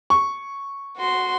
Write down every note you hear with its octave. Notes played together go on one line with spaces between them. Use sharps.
C#6
F#4 C6